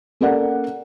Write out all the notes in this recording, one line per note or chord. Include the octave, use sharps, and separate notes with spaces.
A#3 C#4 A4 A#4 D5 F#5